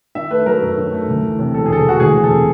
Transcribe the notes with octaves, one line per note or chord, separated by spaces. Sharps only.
D#3 E5
A3 B4
F#3 A#4
F#2
D#3
A3
D2
E3
C3
E1 A4
G#4
D2 A4
G#4
E3 F#4
D2 G#4
E1
A4
C3